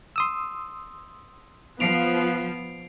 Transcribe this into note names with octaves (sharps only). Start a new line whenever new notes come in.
C6 D#6 E6
F3 B3 C7 D7 F7